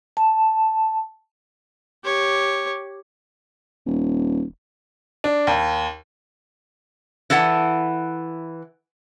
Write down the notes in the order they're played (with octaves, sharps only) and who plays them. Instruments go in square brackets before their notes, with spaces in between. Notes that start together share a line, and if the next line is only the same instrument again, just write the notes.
[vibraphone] A5
[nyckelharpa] G4 C#5
[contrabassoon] D#1
[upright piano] D4
D#2
[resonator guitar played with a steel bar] E3 E4 A4 F#5